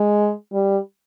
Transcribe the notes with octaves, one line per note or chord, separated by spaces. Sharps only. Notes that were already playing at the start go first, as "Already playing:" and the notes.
Already playing: G#3
G3